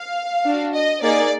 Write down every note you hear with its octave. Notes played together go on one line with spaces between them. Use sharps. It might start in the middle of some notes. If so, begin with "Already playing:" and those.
Already playing: F5
D4 F#4
D#5
A#3 D#4 G#4 D5